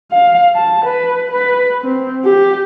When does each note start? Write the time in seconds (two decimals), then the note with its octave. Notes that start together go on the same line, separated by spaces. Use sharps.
0.12 F5
0.56 A5
0.86 B4
1.32 B4
1.83 C4
2.25 G4